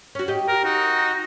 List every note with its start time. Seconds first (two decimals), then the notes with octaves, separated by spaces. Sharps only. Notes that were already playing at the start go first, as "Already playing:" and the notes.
0.15 C#4 F#4
0.28 G4 D#5
0.48 A#4
0.64 D#4 F#4